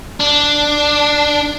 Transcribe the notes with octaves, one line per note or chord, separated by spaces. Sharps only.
D4